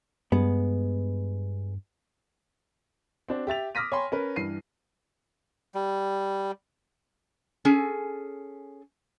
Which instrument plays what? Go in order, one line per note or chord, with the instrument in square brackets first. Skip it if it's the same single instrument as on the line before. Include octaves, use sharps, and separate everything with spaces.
[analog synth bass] G2 [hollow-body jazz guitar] G#3 B3
[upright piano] C4 D4 F#4
G4 E5 A6 F7
D6 D#6 F6 A#6 B6 D#7
C#5 G5 G#5 B5 C6
C#4 A#4 B4
G2 E3 C7 D#7
[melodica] G3
[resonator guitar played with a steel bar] C#4 G#4 A4